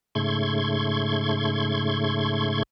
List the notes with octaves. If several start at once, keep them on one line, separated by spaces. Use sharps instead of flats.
G#2 C#3 A3 C6 C#6 G#6